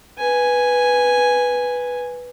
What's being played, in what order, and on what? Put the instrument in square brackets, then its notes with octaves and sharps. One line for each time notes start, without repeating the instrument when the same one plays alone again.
[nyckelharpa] B4 G#5